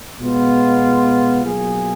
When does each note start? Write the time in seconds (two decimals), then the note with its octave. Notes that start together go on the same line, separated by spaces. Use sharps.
0.20 B2 G#3 B3 F4
1.43 B2 F#3 A#3 F4 G#4